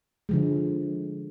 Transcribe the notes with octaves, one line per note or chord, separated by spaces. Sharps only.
D3 F3 G#3